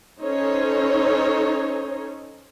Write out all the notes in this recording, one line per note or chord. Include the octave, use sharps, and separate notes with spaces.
C#4 D#4 A4 C5 C#5